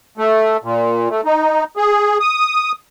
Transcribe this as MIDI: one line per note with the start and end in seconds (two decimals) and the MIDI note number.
0.18 0.57 57
0.64 1.09 46
1.10 1.21 57
1.25 1.64 63
1.77 2.18 68
2.20 2.72 87